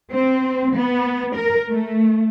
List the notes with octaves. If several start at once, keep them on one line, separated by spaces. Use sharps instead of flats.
C4
B3
A#4
A3